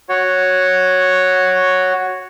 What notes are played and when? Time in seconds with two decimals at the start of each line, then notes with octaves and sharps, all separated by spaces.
0.09 F#4 C#5